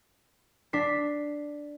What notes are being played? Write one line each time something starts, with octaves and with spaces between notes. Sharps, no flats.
D4 B6 C7